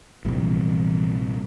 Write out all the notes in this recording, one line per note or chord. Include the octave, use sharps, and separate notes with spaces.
A#1 G2 C3 E3 B3